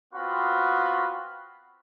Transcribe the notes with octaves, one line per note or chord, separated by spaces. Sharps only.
B3 C4 F4 F#4 B5